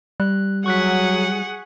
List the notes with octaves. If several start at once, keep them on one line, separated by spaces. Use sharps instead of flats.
G3 F#6
F#3 G#4 F#5 C#6 F#6 B6